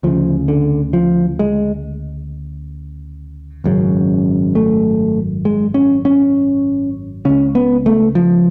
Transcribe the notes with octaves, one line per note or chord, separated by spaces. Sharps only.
D2 C#3 F3
D3
F3
G#3
G#1 F#2 C#3
A3
G#3
C#4
C#4
C#2 C#3 C#4
B3
A3
F3